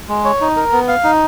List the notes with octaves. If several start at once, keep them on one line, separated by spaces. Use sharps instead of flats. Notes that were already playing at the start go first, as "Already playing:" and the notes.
G#3
C#5
D#4
A#4
B3
F5
D#4